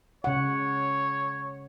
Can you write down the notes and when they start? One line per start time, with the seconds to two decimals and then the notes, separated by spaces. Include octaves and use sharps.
0.24 C#3 C#5 F#5